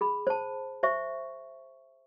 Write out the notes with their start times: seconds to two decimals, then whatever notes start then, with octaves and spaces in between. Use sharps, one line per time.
0.01 G#4 B5
0.27 C5 A5
0.83 C5 E5 C#6